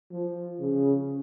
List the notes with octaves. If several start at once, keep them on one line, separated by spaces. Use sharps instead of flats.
F3
C#3